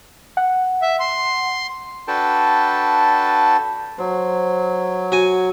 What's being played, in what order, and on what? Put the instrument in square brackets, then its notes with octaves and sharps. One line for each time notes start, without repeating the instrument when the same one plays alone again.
[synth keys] F#5
[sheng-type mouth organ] E5
C6
[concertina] D4 F#4 A4 B4 G5 A5
[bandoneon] F#3 [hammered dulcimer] C5
[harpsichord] F#4 G#5